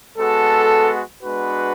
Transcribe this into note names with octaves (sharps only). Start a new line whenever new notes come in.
G#3 B3 F#4 A4
G#3 B3 D4 F#4 B4